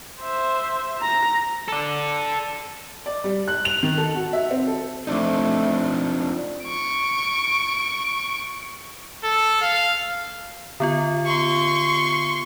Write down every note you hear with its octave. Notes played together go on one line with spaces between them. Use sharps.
C5 E5
A#5 A#6
A4 D5
D5
G3
F#6
F7
D#3
A4
F#4
E5
C4
A4
F3 A3 C4 D4 D#4
C#6 D7
A4
F5
D3 B3 F4
C6 C#6